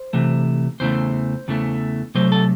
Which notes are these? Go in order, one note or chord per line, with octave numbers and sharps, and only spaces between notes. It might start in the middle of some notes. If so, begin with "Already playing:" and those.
Already playing: C5
C3 E3 A3
E2 C#3 E3 A3 C5
E2 C#3 E3 A3
C3 F#3 A3 C5
A4